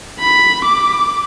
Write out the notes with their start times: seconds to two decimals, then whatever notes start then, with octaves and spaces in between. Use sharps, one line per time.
0.20 B5
0.65 D6